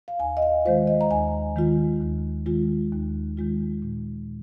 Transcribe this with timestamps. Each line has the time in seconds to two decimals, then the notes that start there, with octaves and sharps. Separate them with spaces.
0.08 F5
0.19 D#2 G#5
0.37 D#5
0.42 F5
0.65 D#3 G#3 F4 C5
0.87 D#5
1.01 A#5
1.11 D#2 G#5
1.56 D#3 G#3 F4
2.01 D#2
2.46 D#3 G#3 F4
2.92 D#2
3.37 D#3 G#3 F4
3.82 A#2